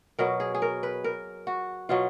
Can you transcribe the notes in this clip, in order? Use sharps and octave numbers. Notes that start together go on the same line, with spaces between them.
B2 F#3 A#4
G#4
G#4
A#4
B4
A#4
F#4
B2 F#3 F4